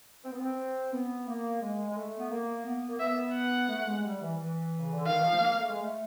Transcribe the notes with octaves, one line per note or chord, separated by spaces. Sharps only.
C4
B3
C4
B3
A#3
G#3
G#3
A3
B3
A#3
B3
A#3
B3 E5
F#5
A3
G#3
G3
E3
E3
C#3
D3
D#3 F5
E3
F3
A3
A#3
A3
G#3
A3